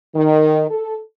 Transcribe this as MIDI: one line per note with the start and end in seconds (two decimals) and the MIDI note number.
0.15 0.64 51
0.70 0.97 69